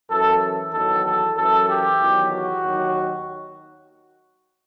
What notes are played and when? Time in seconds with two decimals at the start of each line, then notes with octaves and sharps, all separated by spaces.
0.10 F#2 E3 A4
0.73 E2 D#3 F#3 A4
1.06 A4
1.37 F#2 E3 A4
1.69 G4
1.99 E2 D#3 F#3
2.31 F#4
2.62 D#2 D#3 F#3